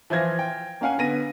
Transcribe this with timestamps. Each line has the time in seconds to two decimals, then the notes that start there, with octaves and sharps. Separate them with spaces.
0.10 E3 F3 F4 G#6 A#6
0.39 G5
0.81 A#3 C#4 F5 F#5 G#5
0.98 D3 B3 A#6 D#7